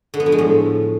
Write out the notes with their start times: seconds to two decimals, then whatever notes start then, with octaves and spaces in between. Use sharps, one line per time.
0.14 D3
0.20 B3
0.26 F3
0.32 G#3
0.38 A2